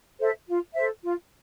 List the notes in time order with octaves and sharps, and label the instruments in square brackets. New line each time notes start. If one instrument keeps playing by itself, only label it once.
[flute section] A4 C5 E5
F4
A4 C5 E5
F4